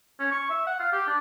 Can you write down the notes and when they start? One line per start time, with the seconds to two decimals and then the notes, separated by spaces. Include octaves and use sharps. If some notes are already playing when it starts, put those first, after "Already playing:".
0.20 C#4
0.31 C#6
0.49 E5
0.67 F#5
0.80 F5
0.92 G4
1.07 D4